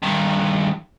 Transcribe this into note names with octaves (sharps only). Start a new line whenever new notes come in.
G2 D#3